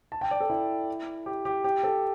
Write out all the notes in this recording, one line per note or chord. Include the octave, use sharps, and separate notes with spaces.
A5
G5
D5
A4
E4
G4
G4
G4
A4